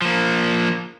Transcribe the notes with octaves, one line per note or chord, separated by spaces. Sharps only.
F3 A#3